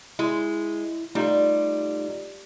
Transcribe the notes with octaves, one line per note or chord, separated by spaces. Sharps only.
G#3 E4
G3 A3 D#4 F4